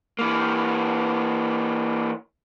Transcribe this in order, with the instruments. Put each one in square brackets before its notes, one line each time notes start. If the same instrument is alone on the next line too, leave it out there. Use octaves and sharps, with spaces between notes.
[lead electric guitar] E3 A#3